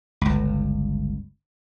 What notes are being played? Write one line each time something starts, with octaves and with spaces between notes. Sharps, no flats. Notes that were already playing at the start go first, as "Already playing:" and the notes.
G1 C#2